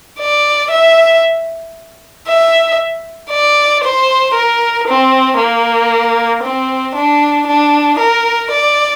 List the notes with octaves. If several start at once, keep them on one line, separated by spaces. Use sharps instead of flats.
D5
E5
E5
D5
C5
A#4
C4
A#3
C4
D4
D4
A#4
D5